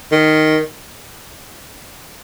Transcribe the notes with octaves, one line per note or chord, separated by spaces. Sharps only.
D#3